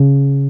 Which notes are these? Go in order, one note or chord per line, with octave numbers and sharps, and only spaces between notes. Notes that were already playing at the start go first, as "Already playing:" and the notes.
Already playing: C#3